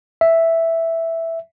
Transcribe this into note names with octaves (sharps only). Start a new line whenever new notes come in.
E5